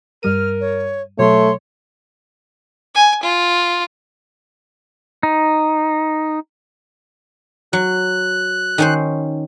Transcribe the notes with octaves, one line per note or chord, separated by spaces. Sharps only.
G2 G3 A#4 F6 D#7
C#5
B2 F#3 A3 C#5 C6
G#5
F4
D#4
F#3 F#6
D#3 C#4 C5